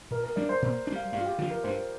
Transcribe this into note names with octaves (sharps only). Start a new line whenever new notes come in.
A#2 A#4
A#4
G3 D4 D5
C5
A#2 C5
D4
G3 F5
G2 F5
F4
G4
D3 F3 F4
A#4
G2 C5